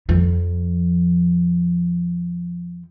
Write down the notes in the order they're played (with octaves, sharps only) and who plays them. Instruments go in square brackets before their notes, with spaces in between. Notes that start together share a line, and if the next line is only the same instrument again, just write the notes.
[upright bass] F2 F3